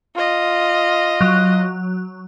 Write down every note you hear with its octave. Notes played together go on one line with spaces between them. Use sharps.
F4 D#5
F#3